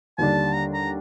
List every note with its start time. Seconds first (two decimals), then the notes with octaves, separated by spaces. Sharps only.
0.18 D#2 D3 G3 D4 A5
0.54 A#5
0.73 A#5